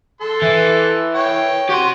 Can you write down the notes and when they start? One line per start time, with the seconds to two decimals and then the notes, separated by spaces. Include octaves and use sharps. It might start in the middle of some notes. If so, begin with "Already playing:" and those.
0.21 A4 C6
0.42 E3
1.15 C#5 G5
1.69 F#4 G4 C6